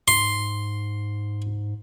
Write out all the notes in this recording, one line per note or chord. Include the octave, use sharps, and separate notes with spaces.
G#2 C6